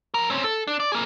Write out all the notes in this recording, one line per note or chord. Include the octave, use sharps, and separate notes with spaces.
F2 A#4
C4 C#4
A4
D4
D5
A#3 G#4